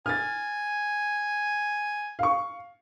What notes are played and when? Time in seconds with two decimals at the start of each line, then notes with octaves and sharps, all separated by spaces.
0.06 G#5 F6 A6
2.19 F5 C#6